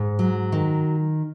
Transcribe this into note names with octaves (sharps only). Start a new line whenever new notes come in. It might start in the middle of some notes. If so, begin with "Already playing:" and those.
Already playing: G#2
F#3
D#3